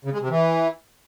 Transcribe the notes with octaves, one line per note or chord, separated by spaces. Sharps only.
C#3
G#3
C3
E3